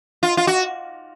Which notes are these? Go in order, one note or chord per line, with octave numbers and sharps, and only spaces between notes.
F4
F4
F#4